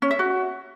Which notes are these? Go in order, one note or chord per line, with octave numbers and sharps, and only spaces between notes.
C#4
E5
F#4